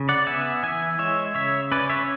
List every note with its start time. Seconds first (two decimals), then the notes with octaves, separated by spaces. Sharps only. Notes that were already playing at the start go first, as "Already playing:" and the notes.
Already playing: C#3
0.09 D5 F#5
0.27 B3 E5 G#5
0.63 E3 E5 G#5
0.99 G#3 C#5 E5
1.35 C#3 C#5 E5
1.72 C#4 B4 D5
1.89 C#5 E5